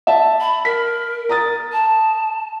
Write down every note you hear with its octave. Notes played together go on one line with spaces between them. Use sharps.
E5 A5
B5
A#4 B6
A#5 D#6 A6
A5